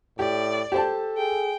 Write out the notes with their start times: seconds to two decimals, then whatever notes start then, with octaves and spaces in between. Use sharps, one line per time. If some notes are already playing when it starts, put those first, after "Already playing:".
0.19 A2 G4 D5
0.72 G4 A4 C5 A5
1.18 G#4 G5